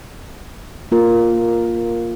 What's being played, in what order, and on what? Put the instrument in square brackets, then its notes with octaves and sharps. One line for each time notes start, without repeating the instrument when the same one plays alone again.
[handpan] A#3 F4 A#4